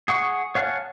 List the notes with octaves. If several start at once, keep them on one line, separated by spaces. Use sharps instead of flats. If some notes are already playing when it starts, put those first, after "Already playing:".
G#4 F#5 C#6
C#5 F5 F#5 G#5 A5